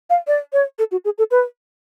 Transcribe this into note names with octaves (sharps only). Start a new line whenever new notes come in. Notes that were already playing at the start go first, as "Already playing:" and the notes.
F5
D5
C#5
A4
F#4
G#4
A4
B4